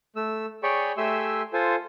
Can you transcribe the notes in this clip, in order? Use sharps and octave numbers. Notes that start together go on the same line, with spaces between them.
A3 E6
G#4 C#5 D5 G5 B5 C#6
A3 G4 E5 G#5 C6 E6
F4 A4 C5 G#5